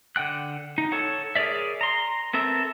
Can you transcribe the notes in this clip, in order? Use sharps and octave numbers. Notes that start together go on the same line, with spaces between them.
D3 F#5 G5 F#6
D#4
A4 C#5 F#5
G#4 A#4 C#5 D5 E5
A#5 C6
B3 C4 A4 A#4 E5